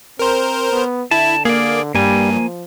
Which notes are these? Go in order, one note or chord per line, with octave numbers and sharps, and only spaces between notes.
C4 A#4 C5
B3
D3 E4 A5
A#3 G#4 D5
G2 G3 A#3 G#5
F3